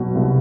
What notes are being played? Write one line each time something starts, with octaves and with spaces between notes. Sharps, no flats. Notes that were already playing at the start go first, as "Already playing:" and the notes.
Already playing: B2 F#3
C2